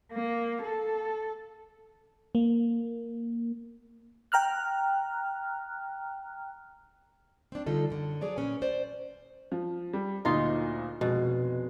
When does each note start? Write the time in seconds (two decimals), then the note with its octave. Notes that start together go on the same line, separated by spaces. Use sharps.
0.13 A#3
0.63 A4
2.35 A#3
4.32 G5 A#5 F6 F#6
7.52 C4 D4
7.66 D3 G3 D#4 F4 A4 D#5
7.90 F#2 D3
8.21 F3 F#3 G#4 C#5 D5 A#5
8.36 A#2 C#4 B4 G#5
8.62 C5 D5
9.52 F3
9.93 G3
10.25 D2 A#2 D#4 F4 D#5
11.01 F1 B2 G#3